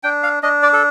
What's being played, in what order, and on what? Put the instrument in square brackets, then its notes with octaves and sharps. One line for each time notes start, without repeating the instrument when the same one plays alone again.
[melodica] D4 G5
F5
D4 D#5
D5
A4